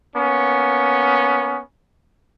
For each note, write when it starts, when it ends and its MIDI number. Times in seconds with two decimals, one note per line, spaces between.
0.16 1.61 58
0.16 1.61 59
0.16 1.61 61